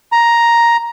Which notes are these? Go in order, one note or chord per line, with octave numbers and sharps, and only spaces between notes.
A#5